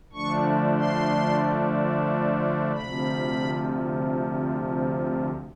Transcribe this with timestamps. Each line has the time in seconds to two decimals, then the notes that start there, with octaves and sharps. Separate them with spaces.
0.13 D3 F3 A3 D4 C#6
0.77 C6
2.72 D2 C3 F3 B5